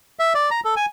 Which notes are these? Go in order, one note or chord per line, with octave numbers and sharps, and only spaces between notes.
E5
D5
A#5
A4
G#5